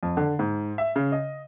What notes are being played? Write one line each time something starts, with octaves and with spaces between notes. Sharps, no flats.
F2
D3
G#2
E5
C#3
D#5